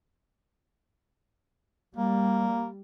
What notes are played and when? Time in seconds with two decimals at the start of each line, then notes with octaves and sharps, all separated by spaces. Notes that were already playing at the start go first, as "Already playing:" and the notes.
1.97 G3 A#3